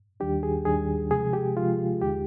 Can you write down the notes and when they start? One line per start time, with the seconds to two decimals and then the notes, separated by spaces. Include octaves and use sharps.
0.20 D#2 D#3 G3 D4 G4
0.43 G#4
0.65 D#2 D#3 G3 D4 G#4
1.11 C3 F3 G#3 G#4
1.33 G4
1.56 C3 F3 G#3 F4
2.02 D#2 D3 G#3 D#4 G4